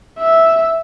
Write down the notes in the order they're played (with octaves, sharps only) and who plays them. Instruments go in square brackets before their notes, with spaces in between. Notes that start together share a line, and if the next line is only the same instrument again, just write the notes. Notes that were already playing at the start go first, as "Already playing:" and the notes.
[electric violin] E5